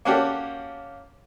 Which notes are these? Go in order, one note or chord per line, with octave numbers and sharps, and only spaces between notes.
A#3 C#4 F#4 G4 A4 D5